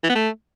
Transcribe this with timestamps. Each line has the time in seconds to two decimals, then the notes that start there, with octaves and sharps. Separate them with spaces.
0.04 E3
0.09 B3
0.15 A3